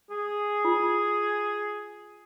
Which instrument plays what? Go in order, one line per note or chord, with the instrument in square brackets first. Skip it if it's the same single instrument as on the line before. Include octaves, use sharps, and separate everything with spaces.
[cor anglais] G#4
[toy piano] F4